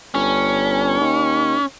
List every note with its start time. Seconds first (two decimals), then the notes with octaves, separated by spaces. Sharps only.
0.15 G1 C#4
1.00 D#2